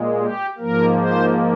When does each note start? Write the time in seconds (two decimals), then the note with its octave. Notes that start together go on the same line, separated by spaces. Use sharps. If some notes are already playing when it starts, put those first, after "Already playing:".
Already playing: A#2 G#3
0.18 G4
0.58 G#2 F3 A#3 A#4
0.97 C5